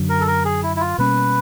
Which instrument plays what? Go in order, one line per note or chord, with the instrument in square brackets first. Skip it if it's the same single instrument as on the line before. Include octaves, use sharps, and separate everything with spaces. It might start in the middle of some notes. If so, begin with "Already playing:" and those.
Already playing: [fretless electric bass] F#2 D3 F#3
[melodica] A#4
A4
A#4
G#4
E4
E4
F4
[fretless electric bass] B2 G3 A#3 C#4 [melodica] B4